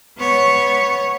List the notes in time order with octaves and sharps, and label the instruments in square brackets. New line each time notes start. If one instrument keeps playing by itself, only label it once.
[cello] B3 C#5